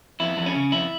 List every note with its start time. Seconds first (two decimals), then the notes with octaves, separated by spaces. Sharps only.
0.20 F2 E4
0.37 F2
0.46 C#4
0.55 C#3
0.72 F2 E4